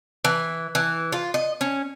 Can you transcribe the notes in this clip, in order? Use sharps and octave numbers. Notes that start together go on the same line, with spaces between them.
E3
E3
F4
D#5
C#4